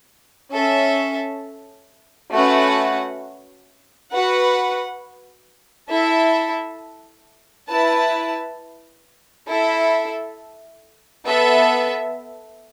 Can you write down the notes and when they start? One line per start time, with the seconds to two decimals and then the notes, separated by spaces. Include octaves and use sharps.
0.53 C#4 A4 E5
2.32 A3 C#4 F#4 B4 F#5
4.11 F#4 B4 F#5
5.89 E4 A4 E5
7.68 E4 B4 A5
9.47 E4 A4 E5
11.26 B3 A4 E5